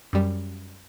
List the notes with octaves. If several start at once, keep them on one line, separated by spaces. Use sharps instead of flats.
F#2 G3